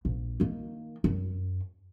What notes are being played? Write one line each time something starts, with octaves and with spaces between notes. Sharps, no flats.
A#1
D#3 A#3
F#2